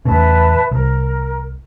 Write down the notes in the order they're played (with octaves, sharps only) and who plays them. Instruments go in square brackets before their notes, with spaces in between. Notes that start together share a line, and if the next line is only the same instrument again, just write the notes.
[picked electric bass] E2 A2 C#3 [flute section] B4 E5 A5
[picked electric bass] C2 [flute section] A#4